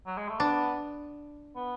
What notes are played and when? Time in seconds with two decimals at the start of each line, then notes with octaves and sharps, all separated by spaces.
0.07 F#3
0.18 G#3
0.29 A3
0.40 B3 D4
1.56 B3